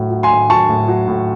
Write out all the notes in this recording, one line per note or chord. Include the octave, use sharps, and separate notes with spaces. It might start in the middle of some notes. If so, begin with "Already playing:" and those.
Already playing: A2 F#3
F#3
G#5 C6
A2
F#3 A5 C#6
A2
F#3
A2